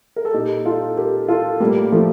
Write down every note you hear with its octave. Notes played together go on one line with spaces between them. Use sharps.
A#4
A4
A#2 D#4 G4
F4 A4
G4 A#4
F4 A4
A2 G3 A#3
F3 A3